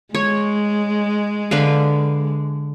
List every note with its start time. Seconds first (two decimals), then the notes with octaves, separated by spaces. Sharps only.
0.14 G#3 C#5
1.51 D3 B4 F5